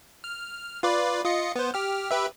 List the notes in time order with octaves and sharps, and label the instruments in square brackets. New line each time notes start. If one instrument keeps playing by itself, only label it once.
[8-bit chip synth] F6
F4 B4 D5
F4 D#5 C#7
B3 C5
G4 F6
G4 B4 E5